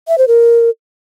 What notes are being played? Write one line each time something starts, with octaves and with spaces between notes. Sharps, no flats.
E5
C5
A#4